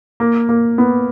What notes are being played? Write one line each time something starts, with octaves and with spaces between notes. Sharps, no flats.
A#3
A#3
B3